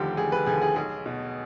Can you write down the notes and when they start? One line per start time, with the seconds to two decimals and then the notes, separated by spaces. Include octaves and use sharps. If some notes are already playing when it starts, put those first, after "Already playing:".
Already playing: F1 D#2 D3 F3 G4
0.17 F1 G#4
0.32 B4
0.46 D#2 D3 F3 G#4
0.62 G#4
0.76 B1 G#4
1.06 B2